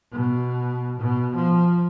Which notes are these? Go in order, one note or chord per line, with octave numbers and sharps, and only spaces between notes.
B2
B2
F3